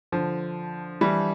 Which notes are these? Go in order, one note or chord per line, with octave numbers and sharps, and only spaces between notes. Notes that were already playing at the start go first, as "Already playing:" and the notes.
D3 F3
E3 G3